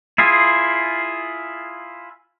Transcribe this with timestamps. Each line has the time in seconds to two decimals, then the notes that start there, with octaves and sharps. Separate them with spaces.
0.18 E4 F4 G#4